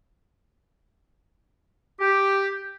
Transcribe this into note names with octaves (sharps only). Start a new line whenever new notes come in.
G4